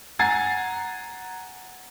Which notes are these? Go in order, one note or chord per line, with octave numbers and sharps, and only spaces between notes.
F#5 G#5 A#5 G#6 A6 C7